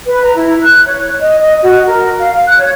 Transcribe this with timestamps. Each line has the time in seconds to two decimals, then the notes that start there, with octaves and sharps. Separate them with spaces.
0.06 B4
0.23 A#5
0.35 E4
0.62 F#6
0.86 C#5
1.20 D#5
1.40 D#5
1.62 F#4
1.86 A#4
2.19 F5
2.47 F#6
2.58 C#5